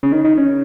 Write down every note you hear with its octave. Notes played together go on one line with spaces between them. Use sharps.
C#3
D#3
D#3
C#3